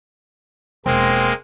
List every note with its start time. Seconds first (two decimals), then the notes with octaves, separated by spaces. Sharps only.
0.86 E1 G#3 A#3 C4